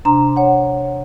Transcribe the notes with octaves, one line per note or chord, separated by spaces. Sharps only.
C3 D4 A#5 C6
C#5 F#5